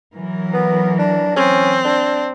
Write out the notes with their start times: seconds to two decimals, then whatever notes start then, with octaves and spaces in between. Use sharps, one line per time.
0.17 E3 F#3 A#4
0.54 B3
0.99 D4
1.36 C4 C#4
1.85 D4